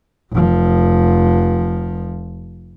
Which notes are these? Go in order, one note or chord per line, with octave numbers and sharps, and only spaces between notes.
F1 F3